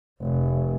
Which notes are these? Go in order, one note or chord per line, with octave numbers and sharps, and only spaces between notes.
F1